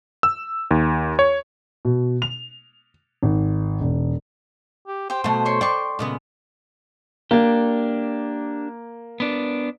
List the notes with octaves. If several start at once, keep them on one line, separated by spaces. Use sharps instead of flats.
E6
D#2
C#5
B2
F7
G#1
E1
G4
G4 C5 G5
B2 A3 F#5 C6
C#5 C6 C#6
D5 G5 C6 C#6
A#2 C#3 G#3 B3
A#3 D4 G4
B3 D4